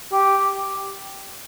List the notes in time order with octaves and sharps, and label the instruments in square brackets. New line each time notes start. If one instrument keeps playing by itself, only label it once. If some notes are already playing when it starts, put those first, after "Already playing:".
[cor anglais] G4